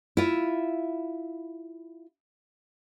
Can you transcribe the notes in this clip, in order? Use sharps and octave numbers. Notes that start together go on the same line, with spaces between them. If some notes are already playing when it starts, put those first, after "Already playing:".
E4 F4